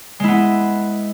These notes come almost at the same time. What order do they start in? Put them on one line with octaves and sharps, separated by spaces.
G#3 E4 B3